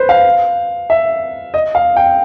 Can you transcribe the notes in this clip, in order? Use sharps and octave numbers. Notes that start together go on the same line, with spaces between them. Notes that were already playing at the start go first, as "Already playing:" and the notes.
Already playing: B4 C5
F5
E5
D#5
F5
G5